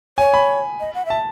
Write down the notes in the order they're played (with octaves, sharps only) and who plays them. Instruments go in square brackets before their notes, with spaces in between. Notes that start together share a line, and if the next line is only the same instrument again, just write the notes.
[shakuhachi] C#5 [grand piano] G#5
[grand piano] B5
[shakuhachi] D#5
F#5
[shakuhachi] E5 [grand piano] A5